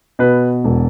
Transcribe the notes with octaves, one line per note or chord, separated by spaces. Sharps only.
B2 B4
E1